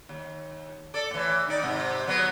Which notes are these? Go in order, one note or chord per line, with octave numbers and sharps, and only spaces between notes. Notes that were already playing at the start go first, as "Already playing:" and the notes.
D#2
A4 D5
A2 E3
D#3 D#4 D5
G#2 C3
F#3 B3